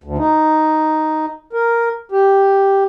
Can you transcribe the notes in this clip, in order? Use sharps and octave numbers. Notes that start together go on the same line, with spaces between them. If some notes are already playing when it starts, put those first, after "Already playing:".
D2
D#4
A#4
G4